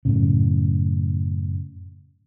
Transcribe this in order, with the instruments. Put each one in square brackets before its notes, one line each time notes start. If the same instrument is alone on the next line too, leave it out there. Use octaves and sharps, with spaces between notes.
[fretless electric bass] F#2 A2 C#3